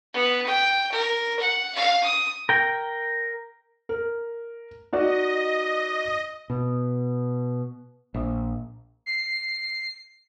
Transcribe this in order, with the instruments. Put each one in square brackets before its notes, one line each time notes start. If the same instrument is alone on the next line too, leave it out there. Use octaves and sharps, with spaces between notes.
[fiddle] B3
G5
A#4
F#5
F5
D#6
[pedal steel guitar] A#4 G5
[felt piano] A#4
[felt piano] D#4 F#4 D5 [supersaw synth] D#5
[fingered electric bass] B2
A#1
[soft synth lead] C7